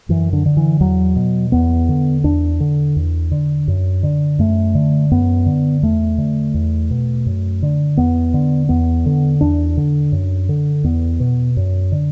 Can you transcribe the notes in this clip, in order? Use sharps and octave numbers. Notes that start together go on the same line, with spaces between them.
F#2 E3
D3
D3
E3
E2 F#3
B2
E2 B3
D3
E2 D4
D3
E2
D3
F#2
D3
F#2 A3
D3
F#2 B3
D3
E2 A3
D3
E2
B2
F#2
D3
E2 B3
D3
E2 B3
D3
E2 D4
D3
F#2
D3
E2 B3
B2
F#2
D3